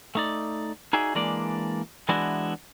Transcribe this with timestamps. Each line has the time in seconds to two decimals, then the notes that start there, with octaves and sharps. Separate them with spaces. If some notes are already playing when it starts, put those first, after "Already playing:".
0.15 A3 D#4 D5
0.93 D#4 F#4 G#4 D5 E5
1.15 E3 G#3 A#3 D4 D5
2.09 E3 G#3 B3 D4 E4 F#4